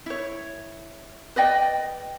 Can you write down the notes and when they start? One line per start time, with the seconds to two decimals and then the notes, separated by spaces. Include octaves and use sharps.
0.06 E4 C#5
1.36 B4 D5 D#5 G5